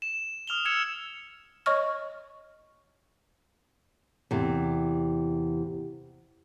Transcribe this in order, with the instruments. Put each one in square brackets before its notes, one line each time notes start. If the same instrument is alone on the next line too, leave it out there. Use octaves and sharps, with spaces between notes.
[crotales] E7
D#6 F6 F7 G7
E6 G#6 C#7 E7
[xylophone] C#5 D#5 C#6 F6
[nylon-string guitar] E2 C3